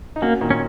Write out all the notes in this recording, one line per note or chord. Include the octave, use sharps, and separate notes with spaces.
D#4
A#3 C#4 F#4
A#2 D#3
C#4